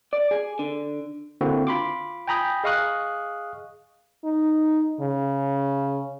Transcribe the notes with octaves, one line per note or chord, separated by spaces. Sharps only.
D5
G#4
D3
D3 A#3 C4 E4 F#4
F4 B5 C6 D6
G5 G#5 A#5 B5 D#6 G6
G#4 D#5 F5 C#6 D#6 F#6
D#4
C#3